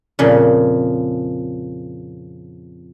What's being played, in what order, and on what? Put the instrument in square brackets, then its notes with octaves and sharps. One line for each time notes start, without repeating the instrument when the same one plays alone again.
[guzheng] F2 A#2 C#3